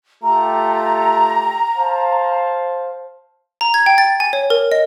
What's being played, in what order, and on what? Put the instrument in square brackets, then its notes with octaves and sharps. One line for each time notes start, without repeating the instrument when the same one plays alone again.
[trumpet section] A3 F4 G4 [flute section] A#5
[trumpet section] C5 F5 A5
[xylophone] A#5
G#6
G5
A6
G#5
C#5
A#4
D#5